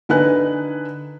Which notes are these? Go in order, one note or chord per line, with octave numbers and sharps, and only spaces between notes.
D3 D#4 B4 G#5 F#6